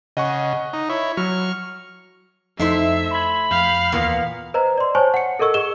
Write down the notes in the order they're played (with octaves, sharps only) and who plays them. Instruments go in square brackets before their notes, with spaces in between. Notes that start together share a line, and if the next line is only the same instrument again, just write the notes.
[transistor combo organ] C#3 [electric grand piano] D#5 F#5 C#6
[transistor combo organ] D#4
E4 C#5
[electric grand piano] F#3 [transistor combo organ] C#6 F6
[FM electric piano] F2 D#4 C7 [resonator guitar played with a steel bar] A3 E4 C5 [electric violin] E5
[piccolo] B5 [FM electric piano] C6 G#6
[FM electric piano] F2 G6 [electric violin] F5
[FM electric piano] D#2 E3 [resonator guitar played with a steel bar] A#2 A#3 B3
[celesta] B4 C5 D#5 A#5
D5 C6
C5 C#5 G#5 A5 C#6
F#5 C#7
A4 A#4 D#5 C#6 E6
G#4 D#5 E7 G7